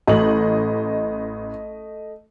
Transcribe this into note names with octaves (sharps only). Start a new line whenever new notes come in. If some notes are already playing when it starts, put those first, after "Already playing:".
A1 A3 D#5 F#7